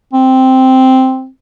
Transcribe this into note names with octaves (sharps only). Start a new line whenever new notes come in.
C4